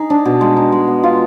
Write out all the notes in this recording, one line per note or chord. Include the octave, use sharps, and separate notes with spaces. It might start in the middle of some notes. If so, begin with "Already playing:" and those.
Already playing: D#4 G#4
D4
B2
G#3
D#4
G#3
B3
F4